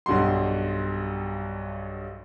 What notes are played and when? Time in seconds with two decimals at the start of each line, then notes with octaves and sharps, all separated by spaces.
0.06 B1 G2 G3 F#4 C6